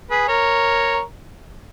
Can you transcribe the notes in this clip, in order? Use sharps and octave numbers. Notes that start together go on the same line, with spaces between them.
G#4 B4
A#4 C#5